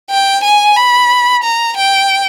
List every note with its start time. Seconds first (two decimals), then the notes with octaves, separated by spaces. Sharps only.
0.10 G5
0.43 G#5
0.76 B5
1.43 A#5
1.76 G5